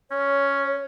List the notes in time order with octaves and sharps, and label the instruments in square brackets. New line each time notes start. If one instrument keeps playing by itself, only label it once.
[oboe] C#4 [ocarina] C#5